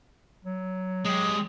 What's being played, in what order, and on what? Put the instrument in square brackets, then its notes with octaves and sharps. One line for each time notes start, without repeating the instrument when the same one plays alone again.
[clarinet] F#3
[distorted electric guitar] G#3 G4 [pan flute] D#6